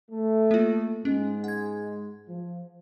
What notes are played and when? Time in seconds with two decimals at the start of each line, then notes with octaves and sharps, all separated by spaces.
0.11 A3
0.51 A#3 F4
1.05 G#2 G#3 C#4
1.44 F#5 G#6
2.29 F3